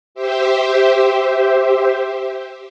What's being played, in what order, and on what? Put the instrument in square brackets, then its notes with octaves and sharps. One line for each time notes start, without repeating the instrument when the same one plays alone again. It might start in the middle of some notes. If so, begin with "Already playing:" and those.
[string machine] G4 C5 E5